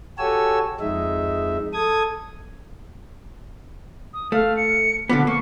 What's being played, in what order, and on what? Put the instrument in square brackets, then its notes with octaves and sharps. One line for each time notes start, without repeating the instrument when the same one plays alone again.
[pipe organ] F#4 G4 A4 C#5 G#5 E6
F2 G#3 D#4 E5
A4 D#6 G#6
[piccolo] D#6
[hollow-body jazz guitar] A3 [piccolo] F5
[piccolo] C#7
[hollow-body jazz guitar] D3 F3 B3 [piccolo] D6
[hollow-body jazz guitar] A#3 [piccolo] C#6